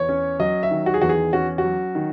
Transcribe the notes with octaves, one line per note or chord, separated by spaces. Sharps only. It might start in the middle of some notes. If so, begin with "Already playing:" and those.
Already playing: E2 C#5
C#4
F#3 D#5
E5
D#3
F#4
G#4
E2 F#4
G#4
C#4 F#4
F#4
F#3
D#3